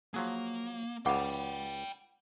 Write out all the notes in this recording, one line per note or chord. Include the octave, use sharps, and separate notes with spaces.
F3 F#3 A#3 G#4
C#2 C#3 F#5 G5 B5 D6